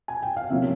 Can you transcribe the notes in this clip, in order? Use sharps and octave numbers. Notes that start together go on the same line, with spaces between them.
G#5
G5
F5
C3 F3 A#3 C#4 E5